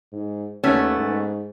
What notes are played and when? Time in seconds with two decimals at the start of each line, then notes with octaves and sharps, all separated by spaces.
0.12 G#2
0.63 D#2 A3 B3 C#4
0.98 G#2